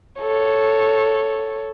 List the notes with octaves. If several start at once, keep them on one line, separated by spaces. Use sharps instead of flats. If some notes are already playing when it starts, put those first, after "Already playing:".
A4 C#5